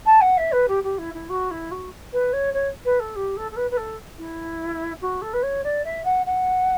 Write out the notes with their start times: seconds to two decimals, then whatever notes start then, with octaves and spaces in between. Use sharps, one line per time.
0.05 A5
0.21 F#5
0.37 E5
0.52 B4
0.68 G4
0.83 G4
0.98 E4
1.14 E4
1.29 F#4
1.51 E4
1.71 F#4
2.12 B4
2.33 C#5
2.53 C#5
2.84 B4
2.99 A4
3.15 G4
3.36 A4
3.51 A4
3.56 B4
3.70 B4
3.77 A4
4.18 E4
5.01 F#4
5.21 A4
5.33 B4
5.42 C#5
5.63 D5
5.84 E5
6.04 F#5
6.26 F#5